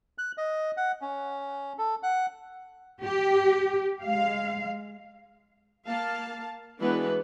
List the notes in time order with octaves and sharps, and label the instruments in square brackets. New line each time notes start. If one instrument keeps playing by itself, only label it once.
[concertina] F#6
D#5
F#5
C#4
A4
F#5
[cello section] G4
G#3 F5
[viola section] A#3 F5 A5
E3 G#3 B3 D4 F#4 B4